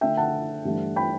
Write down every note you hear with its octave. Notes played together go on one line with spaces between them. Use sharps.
D3 A3 D4 E5 G5
F#5 A5
G2 E3 A3 D4
G5 B5